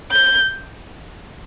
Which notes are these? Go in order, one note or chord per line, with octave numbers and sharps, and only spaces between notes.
G6